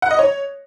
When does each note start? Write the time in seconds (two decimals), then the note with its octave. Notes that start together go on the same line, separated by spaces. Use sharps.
0.02 F#5
0.11 D#5
0.19 C#5